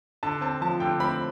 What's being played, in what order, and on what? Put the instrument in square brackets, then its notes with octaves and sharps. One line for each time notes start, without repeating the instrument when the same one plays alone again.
[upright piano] D3 A5
C4 A5
F3 A5
D3 G5
C4 B5